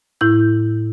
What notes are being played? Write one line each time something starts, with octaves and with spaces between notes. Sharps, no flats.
A2 E4 G6